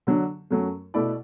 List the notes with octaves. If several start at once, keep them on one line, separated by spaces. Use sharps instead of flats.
D3 F#3 D4
F#2 F#3 A3
B2 A3 E4 D5